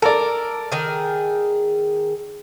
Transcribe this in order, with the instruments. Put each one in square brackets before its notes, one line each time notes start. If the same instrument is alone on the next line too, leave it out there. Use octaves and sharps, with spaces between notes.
[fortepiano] A4 D5 [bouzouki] A#4
[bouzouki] D#3 G#4